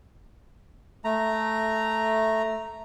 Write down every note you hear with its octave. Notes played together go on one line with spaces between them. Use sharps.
A3 A#5